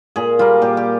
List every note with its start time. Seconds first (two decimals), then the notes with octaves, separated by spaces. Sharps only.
0.16 A#2 G#4
0.39 G3 A#3 F4
0.62 A#2 G4
0.77 G4